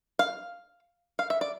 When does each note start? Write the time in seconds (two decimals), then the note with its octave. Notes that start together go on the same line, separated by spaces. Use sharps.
0.19 F5
1.19 F5
1.30 E5
1.41 D5